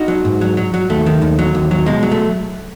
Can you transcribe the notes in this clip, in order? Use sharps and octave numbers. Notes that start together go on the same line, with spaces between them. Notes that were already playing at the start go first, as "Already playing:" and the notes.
Already playing: D#4 F#4
F#3
G#2
F#3
F#3
F#3
D#2 A3
D#3
D#2
F#3
D#2
F#3
B2 G#3
F#3
A3